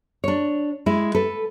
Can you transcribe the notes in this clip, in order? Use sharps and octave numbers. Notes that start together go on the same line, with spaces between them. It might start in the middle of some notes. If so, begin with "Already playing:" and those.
D4 C#5
G#3 E4
A4 B4